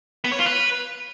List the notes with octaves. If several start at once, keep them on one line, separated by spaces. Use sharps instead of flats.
B3
C#5
F4
B4